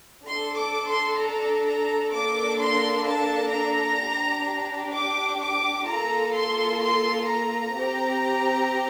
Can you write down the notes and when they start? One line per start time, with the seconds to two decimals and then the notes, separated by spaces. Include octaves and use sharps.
0.25 D4 A4 C6
0.56 D6
0.87 C6
1.19 A#5
1.65 A#5
2.12 A#3 D4 A4 D6
2.58 C6
3.06 A5
3.52 A#5
3.99 D4 G4
4.93 D6
5.39 D6
5.86 A#3 F4 A4 A#5
6.33 C6
6.79 C6
7.26 A#5
7.73 C4 G4